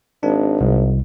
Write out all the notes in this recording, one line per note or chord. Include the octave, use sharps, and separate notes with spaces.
G#1 D4
C2